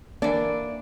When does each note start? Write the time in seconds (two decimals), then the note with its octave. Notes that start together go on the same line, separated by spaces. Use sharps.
0.22 E3 A#3 D4 D5